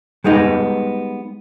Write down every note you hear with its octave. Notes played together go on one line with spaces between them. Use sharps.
G3 G#3 B3 D#4